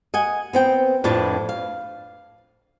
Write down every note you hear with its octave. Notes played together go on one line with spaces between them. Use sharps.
D#5 F#5 G#5
B3 C4 G5
F2 A2 D4 F4 B4 A5
F5